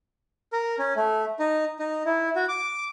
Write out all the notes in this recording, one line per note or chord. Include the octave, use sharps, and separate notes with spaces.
A#4
C#4
A3
D#4
D#4
E4
F#4
D6